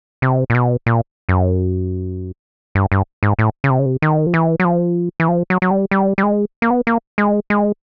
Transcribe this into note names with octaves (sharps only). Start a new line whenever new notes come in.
C3
A#2
B2
A#2
F#2
G2
G2
G#2
A2
C#3
C3
C#3
C3
D#3
F3
E3
F#3
F3
E3
F3
F#3
F#3
G3
G3
G3
G#3
A#3
B3
A#3
G#3
G#3